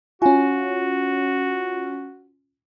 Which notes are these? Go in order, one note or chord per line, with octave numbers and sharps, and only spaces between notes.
C#4 F4 F#4 G#5